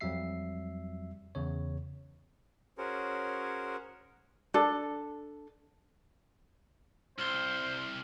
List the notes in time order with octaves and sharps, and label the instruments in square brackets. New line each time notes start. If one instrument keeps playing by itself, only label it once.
[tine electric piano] F2 F#3 G3 E5 C7
E2 C#3 C#5
[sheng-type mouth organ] C#4 F#4 G#4 A#4 C5 C#5
[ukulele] D4 A4
[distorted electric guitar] C2 [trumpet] C5 [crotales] F6 G7